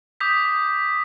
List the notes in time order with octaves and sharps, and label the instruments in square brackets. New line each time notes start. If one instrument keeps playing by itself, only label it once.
[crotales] D6 D#6 G6 B6